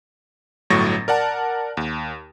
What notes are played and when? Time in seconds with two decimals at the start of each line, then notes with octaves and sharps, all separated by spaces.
0.70 G1 A2 F#3 C#6 A6 A#6
1.08 A#4 D5 F#5 A5
1.77 D#2